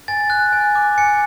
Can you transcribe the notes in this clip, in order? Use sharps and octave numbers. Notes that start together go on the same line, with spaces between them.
G#5 A6
F#6
G#5
D6
G#5 C#7